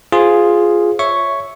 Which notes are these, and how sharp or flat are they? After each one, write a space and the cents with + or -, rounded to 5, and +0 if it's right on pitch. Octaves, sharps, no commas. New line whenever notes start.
F4 +0 G#4 +0 C5 -15
C#5 +5 E5 +0 C#6 +0